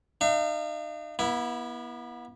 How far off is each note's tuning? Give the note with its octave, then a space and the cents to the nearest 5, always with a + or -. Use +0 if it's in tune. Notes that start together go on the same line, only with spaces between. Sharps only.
D#4 -35 F5 -40
B3 -35 E4 +0